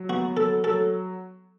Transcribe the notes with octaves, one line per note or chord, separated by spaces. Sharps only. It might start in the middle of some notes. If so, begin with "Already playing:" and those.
Already playing: F#3
B3 F#4
F#3 A4
F#3 A4